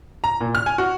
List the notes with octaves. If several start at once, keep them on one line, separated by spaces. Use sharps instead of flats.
A#5
A#2
F6
G#5
F#4